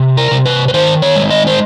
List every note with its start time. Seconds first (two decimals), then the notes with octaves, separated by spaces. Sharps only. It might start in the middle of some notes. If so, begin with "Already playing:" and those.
Already playing: C3
0.17 A#4
0.31 C3
0.46 B4
0.68 B4
0.74 D#3 C5
1.02 C#5
1.16 G#3
1.30 D#5
1.47 C5